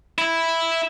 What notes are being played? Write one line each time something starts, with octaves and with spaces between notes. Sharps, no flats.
E4